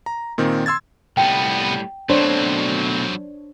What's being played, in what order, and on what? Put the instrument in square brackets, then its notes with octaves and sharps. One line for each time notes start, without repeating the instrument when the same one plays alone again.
[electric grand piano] A#5
A#2 D#3 C4
C6 E6 G#6 A6
[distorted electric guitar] C2 B3 [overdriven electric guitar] A2 G3 [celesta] G5
[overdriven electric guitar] B2 A3 [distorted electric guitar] F#3 C4 [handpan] D4 C5 C#5